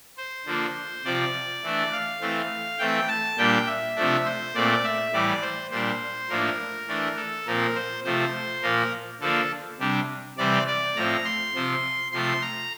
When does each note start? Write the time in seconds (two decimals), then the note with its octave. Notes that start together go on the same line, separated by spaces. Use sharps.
0.17 C5
0.46 D3 F3 A#3 D4
1.04 C3 F3 C4 D5
1.63 E3 A3 D4
1.92 F5
2.21 E3 A3 C4
2.79 E3 A3 C4 G5
3.08 A5
3.37 A#2 G3 D4 G5
3.67 E5
3.96 C3 F3 A3 D4
4.25 C5
4.54 A#2 A3 C4 D5
4.84 E5
5.13 A2 E3 G3 D5
5.42 C5
5.70 A#2 G3 D4 C5
6.29 A2 F3 A#3 D4 A#4
6.88 E3 A3 D4
7.17 A4
7.46 A#2 F3 C4 A#4
7.75 C5
8.04 C3 F3 A3 C5
8.62 A#2 F3 A#3 A#4
9.20 D3 F3 A#3 D4 A4
9.79 C3 G3 D4
10.37 C3 E3 G3 C4 D5
10.67 D5
10.96 A2 F3 C4 A#5
11.25 C6
11.55 C3 F3 C4
12.12 C3 F3 A3 C6
12.42 A#5